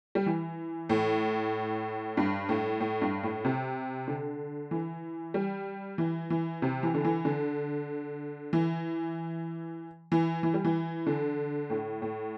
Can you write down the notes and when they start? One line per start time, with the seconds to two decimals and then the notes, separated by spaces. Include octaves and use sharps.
0.15 G3
0.26 E3
0.89 A2
2.17 G2
2.49 A2
2.80 A2
3.02 G2
3.23 A2
3.44 C3
4.08 D3
4.71 E3
5.34 G3
5.98 E3
6.30 E3
6.62 C3
6.83 E3
6.94 D3
7.05 E3
7.25 D3
8.53 E3
10.12 E3
10.43 E3
10.54 G3
10.64 E3
11.07 D3
11.70 A2
12.02 A2